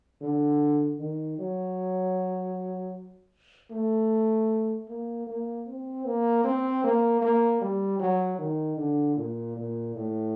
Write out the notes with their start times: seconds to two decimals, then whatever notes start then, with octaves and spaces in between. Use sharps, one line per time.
0.21 D3
1.00 D#3
1.39 F#3
3.71 A3
4.89 A#3
5.27 A#3
5.67 C4
6.05 A#3
6.44 C4
6.84 A#3
7.22 A#3
7.61 G3
8.00 F#3
8.38 D#3
8.77 D3
9.16 A#2
9.56 A#2
9.95 A2